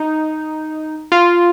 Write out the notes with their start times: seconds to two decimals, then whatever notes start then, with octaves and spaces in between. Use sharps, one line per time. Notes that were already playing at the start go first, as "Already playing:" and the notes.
Already playing: D#4
1.12 F4